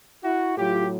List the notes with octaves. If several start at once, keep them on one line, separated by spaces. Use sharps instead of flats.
E4 F#4
A2 F#3 F4 G4